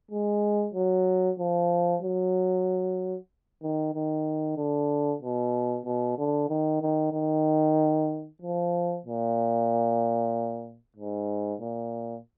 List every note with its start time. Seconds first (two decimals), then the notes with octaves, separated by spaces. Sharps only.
0.11 G#3
0.74 F#3
1.39 F3
2.02 F#3
3.62 D#3
3.95 D#3
4.58 D3
5.22 B2
5.86 B2
6.18 D3
6.49 D#3
6.82 D#3
7.13 D#3
8.42 F3
9.06 A#2
10.97 G#2
11.61 A#2